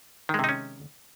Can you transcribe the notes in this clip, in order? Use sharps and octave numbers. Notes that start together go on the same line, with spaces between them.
C3 D#3 G#3 C#4 D#4